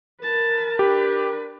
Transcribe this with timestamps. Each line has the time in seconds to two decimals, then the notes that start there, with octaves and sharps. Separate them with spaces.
0.21 A#4 B4 A5
0.79 D4 G4 B4